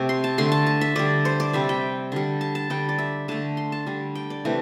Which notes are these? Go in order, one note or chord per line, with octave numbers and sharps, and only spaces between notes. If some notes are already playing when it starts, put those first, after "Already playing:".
Already playing: C3 A3
C6
A5
D3 A3 C6
A5
A5
E5
D3 G3 D5
C5
D5
C3 G3 E5
G5
D3 G3
A5
A5
D3 G3 G5
D5
E5
D3 A3 A5
C6
A5
D3 G3
G5
D5
C3 E3 A3